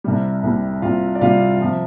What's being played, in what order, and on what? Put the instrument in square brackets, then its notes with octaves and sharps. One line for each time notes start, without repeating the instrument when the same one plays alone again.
[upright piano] C2 C3 G3
C2 C3 G3
C2 C3 G3 F4 F5
D5
C2 C3 G3 F4 F5
C3 F3